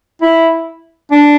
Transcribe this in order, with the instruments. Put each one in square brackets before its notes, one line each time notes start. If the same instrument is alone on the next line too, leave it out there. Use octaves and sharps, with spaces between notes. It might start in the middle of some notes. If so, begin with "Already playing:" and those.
[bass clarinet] E4
D4